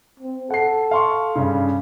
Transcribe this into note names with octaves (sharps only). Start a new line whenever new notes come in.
C4
A4 F#5 C7
F5 C6 C#6
G2 C#3